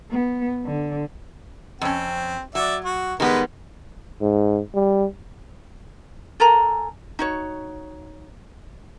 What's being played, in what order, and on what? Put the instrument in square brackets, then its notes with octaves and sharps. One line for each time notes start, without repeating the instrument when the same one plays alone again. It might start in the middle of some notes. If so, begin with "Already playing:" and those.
[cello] B3
D3
[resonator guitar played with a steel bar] F2 C#4 [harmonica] C4
[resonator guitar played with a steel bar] F#3 [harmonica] D5 E5
[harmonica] F#4
[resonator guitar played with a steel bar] D#3 G3 B3 [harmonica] G#3 B4
[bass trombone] G#2
G3
[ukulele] A4 A#4 G#5 A#5
D#4 F#4 C#5